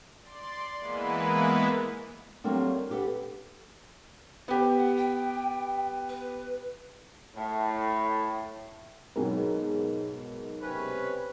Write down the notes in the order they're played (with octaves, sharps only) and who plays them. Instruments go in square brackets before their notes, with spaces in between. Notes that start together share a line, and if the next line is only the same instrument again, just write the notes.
[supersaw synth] D5 C6
E3 G#3 A#3 B3 E4 B4
[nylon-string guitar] F#3 G3 A3 A#3 C4 D4
D4 G4 A4 B4 F#5
[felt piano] B3 G4 [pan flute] C5
[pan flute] F#5
G5
B4
[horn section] A2
[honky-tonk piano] G#2 B2 F#3 [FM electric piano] D#4 G#4 A#4
[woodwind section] C3 C#4 B4